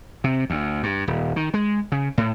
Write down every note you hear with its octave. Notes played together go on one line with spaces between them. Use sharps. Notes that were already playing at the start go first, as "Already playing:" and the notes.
C3
D2
G2
D#1
D#3
G#3
C#3
A2